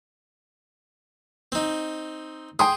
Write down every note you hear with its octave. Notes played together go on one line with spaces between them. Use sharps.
C4 D#4
G#4 G5 C6 D#6